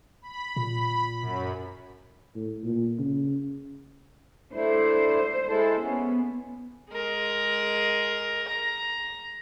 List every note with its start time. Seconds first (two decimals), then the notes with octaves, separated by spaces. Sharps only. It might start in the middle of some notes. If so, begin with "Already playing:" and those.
0.22 B5
0.56 A#2
1.21 F#2
2.35 A2
2.64 A#2
2.99 C#3
4.54 A3 D4 E4 C5
5.48 G#3 E4 A4
5.81 B3 C#4
6.91 G#3 A#4
8.48 A#5